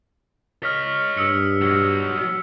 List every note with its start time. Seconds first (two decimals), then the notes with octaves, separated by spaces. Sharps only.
0.63 C#5 D#5 F6 B6
1.17 G2 D#6 E6 C#7
1.61 B1 F#3